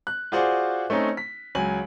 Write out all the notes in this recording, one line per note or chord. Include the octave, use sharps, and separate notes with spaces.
F#6
F4 F#4 G#4 C5 D5 F#5
A3 C4 C#4 D#4
B6
C#2 F#3 G#5 F#7